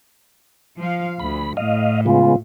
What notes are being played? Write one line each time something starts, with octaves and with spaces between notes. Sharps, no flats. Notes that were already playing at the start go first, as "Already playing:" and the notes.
F3 F5
D2 B5
A2 D#5 F5
C#3 G#3 B3 F4